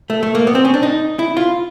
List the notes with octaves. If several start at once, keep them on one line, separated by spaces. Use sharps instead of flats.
A3
A3
A#3
B3
C4
C#4
D4
D#4
E4
F4